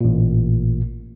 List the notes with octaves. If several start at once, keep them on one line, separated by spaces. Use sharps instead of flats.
A1 A#2